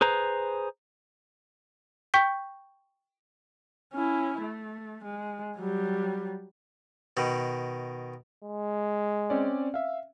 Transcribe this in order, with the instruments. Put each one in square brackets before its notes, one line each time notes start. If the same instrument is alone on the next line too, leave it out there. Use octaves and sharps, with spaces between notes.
[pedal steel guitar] G#4 B4 C5 A#5
[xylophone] G5 C#6 G6 B6
[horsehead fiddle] C#4 E4
A3
G#3
F#3 G3
[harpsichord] B2 D#3
[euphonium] G#3
[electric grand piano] C4 C#4 D5
E5 F5